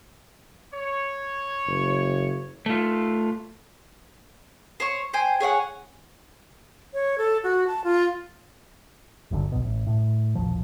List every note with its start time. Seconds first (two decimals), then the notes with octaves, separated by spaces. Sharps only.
0.73 C#5
1.67 F#1
2.66 A3 F4
4.80 C5 C#5 C#6
5.13 C5 G5 G#5
5.40 G#4 C#5 F5 F#5
6.94 C#5
7.18 A4
7.43 F#4
7.67 A5
7.84 F4
9.31 G1 F#2 D3
9.52 B1 B2
9.64 A1
9.87 A2
10.35 E1 A#1 F3